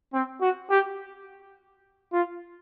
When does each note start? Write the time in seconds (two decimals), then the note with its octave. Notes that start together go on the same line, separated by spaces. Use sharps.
0.13 C4
0.41 F#4
0.70 G4
2.13 F4